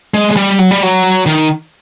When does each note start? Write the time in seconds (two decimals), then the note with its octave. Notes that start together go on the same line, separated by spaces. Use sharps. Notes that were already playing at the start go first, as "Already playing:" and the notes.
0.14 G#3
0.31 G#3
0.36 G3
0.59 F#3
0.71 G3
0.83 F#3
1.26 D#3